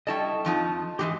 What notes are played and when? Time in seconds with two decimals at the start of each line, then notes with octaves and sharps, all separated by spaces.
0.07 G3 E4 A4 D#5 A5 C#6
0.45 F2 F3 D#4
0.99 G#2 E3 G#3 G4 D#5